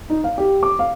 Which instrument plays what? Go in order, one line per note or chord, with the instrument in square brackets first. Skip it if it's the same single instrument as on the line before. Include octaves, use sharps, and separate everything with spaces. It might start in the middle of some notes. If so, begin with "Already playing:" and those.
[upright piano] D#4
F5
G4
D6
F5